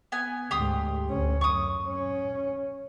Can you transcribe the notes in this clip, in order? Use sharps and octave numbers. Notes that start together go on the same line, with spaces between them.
B3 G#5
D2 G#2 G4 C6 D#6
D2 C#4
F#2 C#6 D#6
C#4